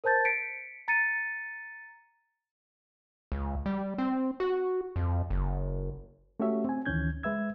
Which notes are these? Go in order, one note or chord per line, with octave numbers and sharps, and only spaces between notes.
A#4 C5 A5 G6 A6
B6 C#7 D7
A#5 A6 C#7 D#7
C#2
G3
C4
F#4
F2
F#1
A3 C#4 F#4 G4 C#5 E5
C4 G#5
D2 D#3 E3 C#4 G6 G#6
G#3 B4 E5 E6 G#6